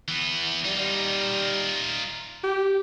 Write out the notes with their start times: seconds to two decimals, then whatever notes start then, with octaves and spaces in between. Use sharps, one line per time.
0.08 E3 B3
0.65 G3 D#4 F4
2.44 G4